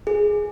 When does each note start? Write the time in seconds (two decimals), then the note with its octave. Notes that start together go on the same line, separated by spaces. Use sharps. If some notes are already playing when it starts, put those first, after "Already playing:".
0.07 G#4